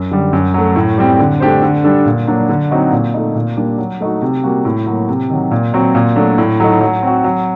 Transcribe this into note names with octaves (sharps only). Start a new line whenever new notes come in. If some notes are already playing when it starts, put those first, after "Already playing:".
Already playing: F#2
D3 G3
F#2
F#3 A3
A2
G3 C4 G4
D3
A3 D4 G4 C5
D3
G3 D4 A4
A#2
F#3 A#3 D4
D3
F#3 C4 D#4 F#4
A#2
A3 D#4
A#2
G3 A#3 D4
F#3
A3 D#4 F#4
C3
G3 A#3 F#4
A2
F#3 A#3
C3
D#3 F#3
A#2
F#3 C4 F#4
A#2
F#3 A3 D4
A2
F#3 A3 D#4
F#3
C4 F#4
F#3